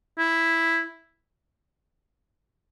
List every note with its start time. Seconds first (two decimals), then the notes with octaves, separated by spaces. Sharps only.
0.18 E4